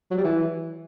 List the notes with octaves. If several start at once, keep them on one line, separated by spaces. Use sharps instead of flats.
F#3
G3
E3